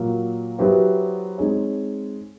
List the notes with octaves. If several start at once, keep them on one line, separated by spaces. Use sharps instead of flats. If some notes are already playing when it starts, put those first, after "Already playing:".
Already playing: A#2 F#3 A#3
F#3 B3 E4 G4 C5
G#3 C4 D#4 G#4 C#5